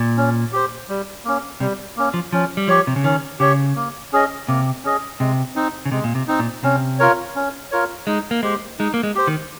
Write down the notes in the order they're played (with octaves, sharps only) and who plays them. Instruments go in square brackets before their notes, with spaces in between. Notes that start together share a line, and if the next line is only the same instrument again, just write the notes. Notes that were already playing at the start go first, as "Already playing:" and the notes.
Already playing: [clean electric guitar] A#2
[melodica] C#4
G4 C5
G3
A#3 C#4
[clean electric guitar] C3 [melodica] G3
[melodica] A#3 C#4
[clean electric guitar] F3
[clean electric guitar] F3 [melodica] C#4
[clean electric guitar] G3
[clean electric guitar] F3 [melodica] G4 C#5
[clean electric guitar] C3
C#3
[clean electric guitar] D#3 [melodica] C#4
[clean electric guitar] C#3 [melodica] G4 C#5
[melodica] A#3
C#4 G#4 D#5
[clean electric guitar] C3 [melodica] A#3
[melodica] C#4 G#4 D#5
[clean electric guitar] C3 [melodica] G#3
[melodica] C4 D#4
[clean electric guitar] C#3
[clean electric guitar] C3 [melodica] G#3
[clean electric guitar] A#2
C3
[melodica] C4 D#4
[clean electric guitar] A#2
[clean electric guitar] C3 [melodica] C#4
[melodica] F4 A#4 C#5
C#4
F4 A#4 C#5
[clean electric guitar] G#3 [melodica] D#4
[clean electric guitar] A#3
[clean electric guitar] G#3 [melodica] G4 C5
[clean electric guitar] G#3 [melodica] D#4
[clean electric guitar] A#3
G#3
[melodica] G4 C5
[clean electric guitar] D#3